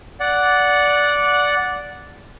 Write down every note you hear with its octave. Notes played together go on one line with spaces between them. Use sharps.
D5 F#5